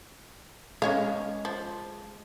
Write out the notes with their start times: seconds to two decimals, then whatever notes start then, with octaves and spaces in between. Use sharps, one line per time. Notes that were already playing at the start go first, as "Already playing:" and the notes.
0.82 G#3 C#4 C#5 F5
1.45 F3